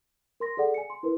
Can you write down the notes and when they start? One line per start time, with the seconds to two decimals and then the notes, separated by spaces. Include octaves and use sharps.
0.40 A#4 C6 A#6
0.57 G#4 A4 D5 F#5
0.74 G#5 C#7
0.90 C6
1.03 E4 A#4 B4